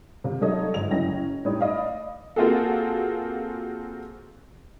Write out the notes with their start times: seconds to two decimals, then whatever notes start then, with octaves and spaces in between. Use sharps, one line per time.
0.24 C3 F4
0.41 F#3 G3 D#4 A4 C#5 D#5
0.74 G1 G#2 D#5 F7
0.91 F#1 F#3 C#4 E4 G5 A#6
1.45 A2 G3 D#4 C#5 D5 D#6
1.59 D5 D#5 F5 B5
2.36 A#3 C4 F4 F#4 G#4 A4